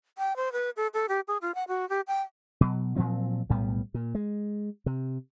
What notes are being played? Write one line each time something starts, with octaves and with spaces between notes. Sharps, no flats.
G5
C5
B4
A4
A4
G4
G#4
F4
F#5
F#4
G4
G5
B2 F#3
A#2 F3 F#3 C4
B1 A2 G3 B3
A#2
G#3
C3